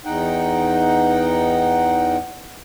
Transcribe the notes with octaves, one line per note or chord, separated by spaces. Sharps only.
E2 D#4 F#5 G5